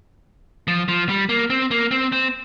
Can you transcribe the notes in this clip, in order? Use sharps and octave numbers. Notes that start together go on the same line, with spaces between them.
F3
F3
G3
A#3
C4
A#3
C4
C4